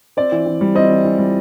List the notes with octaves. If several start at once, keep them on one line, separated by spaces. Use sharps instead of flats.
C4 D5
E3
E3
G3
C4 D#5
E3
E3
G3